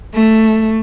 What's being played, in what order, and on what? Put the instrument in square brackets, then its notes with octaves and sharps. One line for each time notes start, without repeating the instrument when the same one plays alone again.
[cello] A3